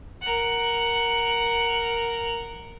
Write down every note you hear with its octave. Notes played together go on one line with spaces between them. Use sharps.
A#4 F#5